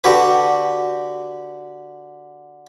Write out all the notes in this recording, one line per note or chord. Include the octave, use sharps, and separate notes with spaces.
D3 F#4 G4 B4